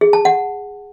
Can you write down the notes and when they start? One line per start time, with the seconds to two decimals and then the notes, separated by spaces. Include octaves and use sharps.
0.01 G#4
0.13 A5
0.25 F#5